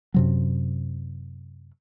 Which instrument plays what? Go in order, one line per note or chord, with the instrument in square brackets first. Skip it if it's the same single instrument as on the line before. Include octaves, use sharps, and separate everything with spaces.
[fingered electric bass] F#2 C3 F#3